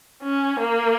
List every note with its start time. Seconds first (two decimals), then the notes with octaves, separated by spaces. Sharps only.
0.23 C#4
0.60 A#3